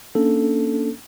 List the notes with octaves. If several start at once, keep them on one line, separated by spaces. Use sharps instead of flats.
A#3 C#4 D4 A4